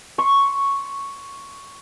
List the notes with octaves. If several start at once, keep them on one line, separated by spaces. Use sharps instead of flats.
C6 C#6